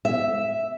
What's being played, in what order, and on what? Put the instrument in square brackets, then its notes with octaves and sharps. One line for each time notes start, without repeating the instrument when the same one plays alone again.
[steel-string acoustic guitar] E5